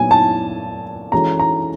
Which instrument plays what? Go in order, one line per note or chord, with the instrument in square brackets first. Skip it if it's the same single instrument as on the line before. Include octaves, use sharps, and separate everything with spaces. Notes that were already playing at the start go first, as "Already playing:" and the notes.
Already playing: [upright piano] A#2 F#3 B3 [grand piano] G#5
[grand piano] A5
[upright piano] E3 G#3 C#4 F#4 A4 [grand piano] A#5
[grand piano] A#5